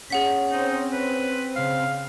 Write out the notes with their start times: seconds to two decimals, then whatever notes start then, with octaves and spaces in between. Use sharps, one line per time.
0.10 C#4 G#4 F#5 B6
0.52 C4 D#4
0.93 B4
1.56 C#3 F5